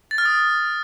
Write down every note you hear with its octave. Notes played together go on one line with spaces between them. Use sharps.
A6
F6
D#6